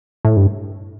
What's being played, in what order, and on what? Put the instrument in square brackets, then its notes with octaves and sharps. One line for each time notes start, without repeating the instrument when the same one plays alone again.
[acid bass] A2
G2